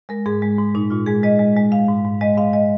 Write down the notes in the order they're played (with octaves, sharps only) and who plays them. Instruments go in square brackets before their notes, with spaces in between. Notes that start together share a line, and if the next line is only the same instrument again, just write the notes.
[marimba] G#3 A#4
G#2 G#4
G#3
G#2
A#2 D#4
A#2 F4
G#3 G#4
G#3 D#5
G#3
G#3
G#3 F5
G#2
G#2
G#3 D#5
G#2 F5
G#3 D#5